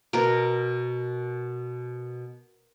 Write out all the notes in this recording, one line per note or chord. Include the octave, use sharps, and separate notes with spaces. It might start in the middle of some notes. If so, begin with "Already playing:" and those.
B2 A#4